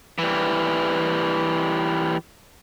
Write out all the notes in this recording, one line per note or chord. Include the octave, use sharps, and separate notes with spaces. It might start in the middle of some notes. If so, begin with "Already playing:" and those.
E3 G3